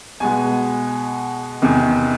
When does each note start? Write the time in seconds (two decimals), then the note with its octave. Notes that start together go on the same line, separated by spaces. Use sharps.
0.20 B2 G#3 B3 G#5
1.62 E2 C3 D#3